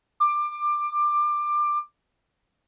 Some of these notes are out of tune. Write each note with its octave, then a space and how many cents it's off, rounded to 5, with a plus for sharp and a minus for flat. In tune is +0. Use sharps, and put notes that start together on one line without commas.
D6 +20